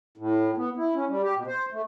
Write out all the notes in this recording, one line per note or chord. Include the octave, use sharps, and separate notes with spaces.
A2
B3
E4
C#4
G3
G4
B2
C5
A3